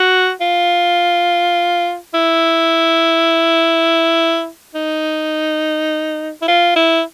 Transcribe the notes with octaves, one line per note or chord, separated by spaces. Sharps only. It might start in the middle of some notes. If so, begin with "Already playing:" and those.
Already playing: F#4
F4
E4
D#4
E4
F4
E4